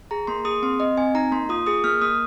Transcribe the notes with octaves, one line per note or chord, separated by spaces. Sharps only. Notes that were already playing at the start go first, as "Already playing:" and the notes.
G#4 A#5
A#3 C6
G#4 D#6
C4 C6
C4 D#5
C4 G#5
D#4 A#5
A#3 C6
F4 D#6
G#4 D#6
A#3 F6
A#3 D#6